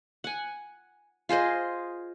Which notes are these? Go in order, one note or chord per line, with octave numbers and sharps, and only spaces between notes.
F#5 G#5
F4 G#4 C5 D#5